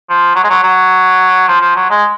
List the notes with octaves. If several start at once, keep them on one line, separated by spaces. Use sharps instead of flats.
F3
F#3
G#3
F#3
F#3
F3
F3
F#3
G#3